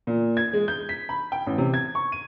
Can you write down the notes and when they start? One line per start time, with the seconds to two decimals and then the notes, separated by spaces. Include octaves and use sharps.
0.07 A#2
0.37 G#6
0.53 G#3
0.68 G6
0.89 B6
1.09 B5
1.32 G5
1.47 A1
1.58 C3
1.74 G#6
1.95 C#6
2.12 D#7